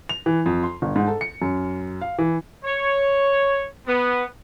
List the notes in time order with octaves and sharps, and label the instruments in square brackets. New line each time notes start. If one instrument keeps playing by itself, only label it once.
[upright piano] F7
E3
F2
C6
G1
G#2
A4
C#7
F#2
F5
E3
[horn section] C#5
B3